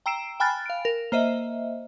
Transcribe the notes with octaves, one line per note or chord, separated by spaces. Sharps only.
G5 A#5 E6 C7 D7 E7
G5 G#5 B5 F6 F#6 A6
F5 D7
A#4
A#3 C5 D#5 E5